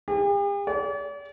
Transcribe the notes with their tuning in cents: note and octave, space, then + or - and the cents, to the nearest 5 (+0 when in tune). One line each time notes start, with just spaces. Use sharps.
G4 +45
D5 -45